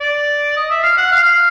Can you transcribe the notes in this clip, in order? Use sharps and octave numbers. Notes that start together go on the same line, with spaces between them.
D5
D#5
E5
F5
F#5
F5